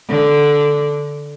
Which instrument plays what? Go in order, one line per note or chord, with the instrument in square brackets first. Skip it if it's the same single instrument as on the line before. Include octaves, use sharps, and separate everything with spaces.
[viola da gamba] D3